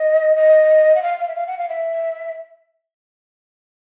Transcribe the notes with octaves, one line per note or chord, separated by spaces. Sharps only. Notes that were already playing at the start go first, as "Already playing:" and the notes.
Already playing: D#5
D#5
F#5
F5
F5
E5
F5
F#5
F5
E5